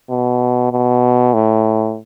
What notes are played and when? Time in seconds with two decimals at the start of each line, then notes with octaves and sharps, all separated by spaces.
0.10 B2
0.72 B2
1.34 A2